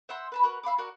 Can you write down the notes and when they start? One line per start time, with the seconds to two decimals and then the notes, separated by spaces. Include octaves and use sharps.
0.09 C5 E5 F#5 C6
0.32 B4 A5 B5
0.43 F#4 A#4 B4
0.63 E5 F5 B5 D6
0.78 F#4 A#4 D5 F#5